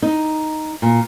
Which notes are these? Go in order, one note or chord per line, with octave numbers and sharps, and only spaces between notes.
D#4
A#2